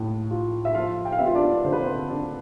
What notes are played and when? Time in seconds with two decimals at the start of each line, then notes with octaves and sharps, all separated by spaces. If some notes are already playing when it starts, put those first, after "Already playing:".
Already playing: A2
0.30 F4
0.65 E5
0.74 F3 F4 F5
1.05 G5
1.12 F5
1.19 B3 E5
1.26 F4 F5
1.35 D4 D5
1.65 D3 C5
1.72 B4
1.81 C4 C5
2.10 D4